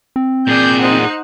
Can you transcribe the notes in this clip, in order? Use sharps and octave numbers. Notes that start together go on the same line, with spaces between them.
C4
A#2 G#4 D5 G6
D#4 C5 F#5